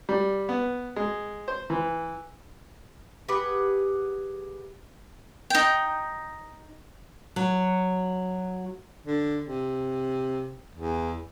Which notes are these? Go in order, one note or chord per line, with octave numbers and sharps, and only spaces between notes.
G3
B3
G#3
C5
E3
G4 G#4 B4 F#5
D#4 G5
F#3
D3
C3
E2